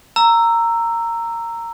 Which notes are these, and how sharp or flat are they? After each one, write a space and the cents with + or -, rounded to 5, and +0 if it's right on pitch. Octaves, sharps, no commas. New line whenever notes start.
A#5 -10 E6 +10